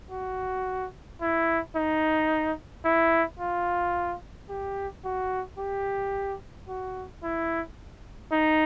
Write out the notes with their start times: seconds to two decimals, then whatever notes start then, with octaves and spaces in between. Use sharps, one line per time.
0.11 F#4
1.21 E4
1.76 D#4
2.85 E4
3.39 F4
4.49 G4
5.05 F#4
5.58 G4
6.68 F#4
7.23 E4
8.32 D#4